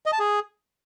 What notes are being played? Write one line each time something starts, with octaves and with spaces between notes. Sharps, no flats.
D#5
A5
G#4